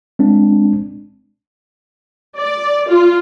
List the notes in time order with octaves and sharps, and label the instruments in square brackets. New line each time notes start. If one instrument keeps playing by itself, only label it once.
[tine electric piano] G#3 C4 D4
[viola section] D5
F4